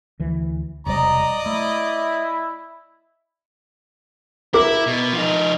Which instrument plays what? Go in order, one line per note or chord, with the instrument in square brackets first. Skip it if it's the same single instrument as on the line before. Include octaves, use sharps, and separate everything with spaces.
[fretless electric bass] D2 E3
[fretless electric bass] E1 C3 G3 [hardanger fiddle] D5 D#5 [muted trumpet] A#5
[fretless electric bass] A3 [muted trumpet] E4
[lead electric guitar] E4 [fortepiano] A#4 D6
[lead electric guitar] B2
F3 D#4